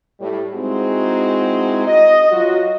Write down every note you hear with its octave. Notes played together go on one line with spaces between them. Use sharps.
A2 G3
G#3 C4 D#4 E4 F#4 G#4
D#5
F#3 F4 F#4